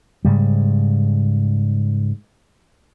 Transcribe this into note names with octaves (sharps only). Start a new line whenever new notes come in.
G#2 C#3 G3